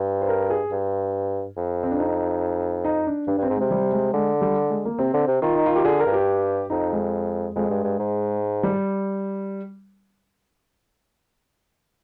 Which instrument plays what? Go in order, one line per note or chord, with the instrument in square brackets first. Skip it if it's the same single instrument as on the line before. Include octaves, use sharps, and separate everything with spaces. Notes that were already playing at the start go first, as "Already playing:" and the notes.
Already playing: [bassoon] G2
[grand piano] C5
A#4
G#4
[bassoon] G2
F2
[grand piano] C4
D4
D#4
D#4
D4
[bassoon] G2 [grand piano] D4
[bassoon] G2 [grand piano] C4
[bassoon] G#2
[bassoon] C3 [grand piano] G#3
[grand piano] G3
G#3
[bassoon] D3 [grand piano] G#3
[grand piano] G3
G#3
A#3
[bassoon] C3 [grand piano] C4
[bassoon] D3
C3
[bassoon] D#3 [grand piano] F4
[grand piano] D#4
F4
G4
[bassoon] D3 [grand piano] G#4
[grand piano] A#4
[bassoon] G2
[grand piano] G4
[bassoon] F2 [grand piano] D#4
[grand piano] G#3
[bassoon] F2 [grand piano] G#3
[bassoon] G2
G2
G#2
[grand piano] G3